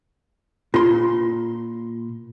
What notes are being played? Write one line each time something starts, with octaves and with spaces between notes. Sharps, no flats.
A#2 F4 C6